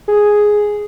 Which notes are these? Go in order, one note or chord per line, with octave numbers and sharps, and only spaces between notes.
G#4